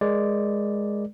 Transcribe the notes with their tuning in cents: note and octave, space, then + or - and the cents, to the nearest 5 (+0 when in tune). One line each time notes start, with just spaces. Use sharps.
G#3 +0 A#4 +20 D5 +0